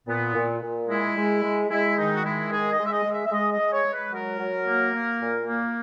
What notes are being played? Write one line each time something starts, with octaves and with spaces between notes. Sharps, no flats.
A#2 B3
A#2
A#2
G#3 E4
G#3
G#3
G#3 E4
D#3 D#4
F#4
G#3 E4
D#3 G#4
D#5
G#3
E5
D#5
G#3
E5
E5
G#3 D#5
D#5
G#3
C#5
G#3
B4
F#3 A#4
F#3
A#3
A#3
A#2
A#3